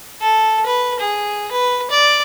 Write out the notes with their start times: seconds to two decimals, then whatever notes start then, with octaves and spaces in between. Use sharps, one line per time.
0.21 A4
0.66 B4
1.00 G#4
1.51 B4
1.91 D5